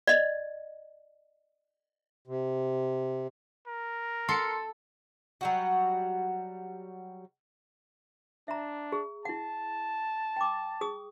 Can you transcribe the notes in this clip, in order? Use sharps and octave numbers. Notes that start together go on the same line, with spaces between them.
D5 D#5
C3
A#4
A4 C6 C#7
F#3 G3 F#4
D4 E5 A#5
G#4
E4 F#5 A5
G5 D6
G#4 D#6